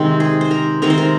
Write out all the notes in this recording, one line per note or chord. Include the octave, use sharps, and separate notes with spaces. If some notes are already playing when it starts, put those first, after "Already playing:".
Already playing: C3 D#3 G#3 C4
G#4
C5
A#4
C3 D#3 G#3 C4 A#4
C5
A#4